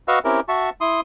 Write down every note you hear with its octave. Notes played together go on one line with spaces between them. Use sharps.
F#4 B4 D#5 F5 C#6 E6
C4 C#4 E4 G4 A#4
F#4 E5 A5 C#6
E4 C6 D#6